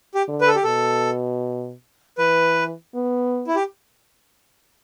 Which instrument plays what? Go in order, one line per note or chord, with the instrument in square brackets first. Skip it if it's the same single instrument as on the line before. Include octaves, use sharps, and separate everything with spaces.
[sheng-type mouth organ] G4
[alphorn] D3
[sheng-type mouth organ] B4
A4
G4
[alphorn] B2 [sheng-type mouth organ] A4
[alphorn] E3 [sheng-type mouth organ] B4
[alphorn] B3
[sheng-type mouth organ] E4
G4